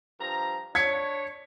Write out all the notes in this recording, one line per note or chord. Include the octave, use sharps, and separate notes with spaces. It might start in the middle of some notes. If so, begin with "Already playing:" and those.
G2 F3 A#5
D4 C#5 G#6 B6 C#7